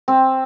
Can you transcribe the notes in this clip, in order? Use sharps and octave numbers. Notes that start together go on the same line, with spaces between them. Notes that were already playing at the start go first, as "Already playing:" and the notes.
C4